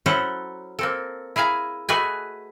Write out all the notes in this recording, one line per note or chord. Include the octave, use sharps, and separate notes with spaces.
F#3 C#4 E4 A4 C5 F#5
A#3 C4 A4
E4 G#4 F5 G#5 A#5
A3 F#4 G#4 B4 D#5 G#5